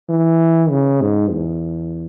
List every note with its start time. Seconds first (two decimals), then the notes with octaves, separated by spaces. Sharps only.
0.09 E3
0.70 C#3
1.01 G#2
1.32 E2